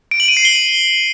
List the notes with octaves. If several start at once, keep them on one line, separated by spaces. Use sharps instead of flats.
D7
F#7
D#7
C7
G7